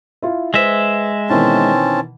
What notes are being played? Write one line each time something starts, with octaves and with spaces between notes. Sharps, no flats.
E4 F4
G#3 B4 C5 E5
B2 D#3 E3 C4 C#4 A5